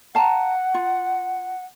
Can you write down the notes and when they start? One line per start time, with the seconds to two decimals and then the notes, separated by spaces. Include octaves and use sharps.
0.15 F5 F#5 A5 A#5
0.74 F4